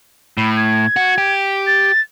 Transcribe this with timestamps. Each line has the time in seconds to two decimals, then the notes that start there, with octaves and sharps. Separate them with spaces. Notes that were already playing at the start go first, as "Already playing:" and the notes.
0.37 A2 B5
0.57 G#6
0.96 F#4
1.18 G4
1.67 A6